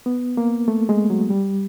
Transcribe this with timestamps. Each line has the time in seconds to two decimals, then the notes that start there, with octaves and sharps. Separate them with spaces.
0.06 B3
0.37 A#3
0.68 A3
0.89 G#3
1.10 F#3
1.30 G3